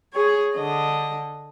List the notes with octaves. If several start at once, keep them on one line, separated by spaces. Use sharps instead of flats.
G#4 C#5
D3 D#5